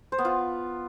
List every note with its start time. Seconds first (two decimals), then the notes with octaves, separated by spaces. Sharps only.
0.12 C5
0.18 B3
0.25 F4